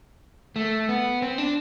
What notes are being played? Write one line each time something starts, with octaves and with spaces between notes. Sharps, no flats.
A3
B3
C4
D4